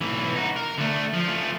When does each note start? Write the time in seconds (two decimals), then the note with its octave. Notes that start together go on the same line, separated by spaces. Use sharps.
0.01 B1 E3
0.35 D#4 F#4
0.56 A#4
0.78 D3 A3
1.14 F3
1.28 F3 A3